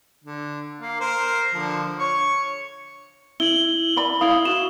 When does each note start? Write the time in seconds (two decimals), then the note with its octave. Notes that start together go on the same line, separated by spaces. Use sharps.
0.24 D3
0.81 A#3 F5
1.00 A#4 C5
1.54 D3 F3
1.99 C#5 C#6
3.40 E4 F#7 G7
3.96 D5 B5
4.21 E4 F5 D#6
4.45 F#4 E7